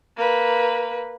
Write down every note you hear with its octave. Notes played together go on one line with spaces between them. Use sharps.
A#3 B4